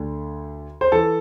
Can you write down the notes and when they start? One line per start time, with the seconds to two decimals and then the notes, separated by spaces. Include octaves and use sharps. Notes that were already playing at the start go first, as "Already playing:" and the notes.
Already playing: D2 D3
0.81 C5
0.92 E3 A4